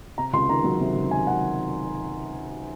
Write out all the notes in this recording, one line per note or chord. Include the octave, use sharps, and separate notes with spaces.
C3 A#5
C#2 C6
D#3 A#5
F#3
C3
C#2
D#3 G#5
F#3 F#5